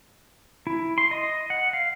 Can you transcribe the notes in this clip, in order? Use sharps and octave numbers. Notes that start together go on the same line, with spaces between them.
E4
C6
D#5
F#5
F5